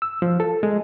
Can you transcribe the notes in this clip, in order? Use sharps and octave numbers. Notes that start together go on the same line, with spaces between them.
E6
F3
A4
G#3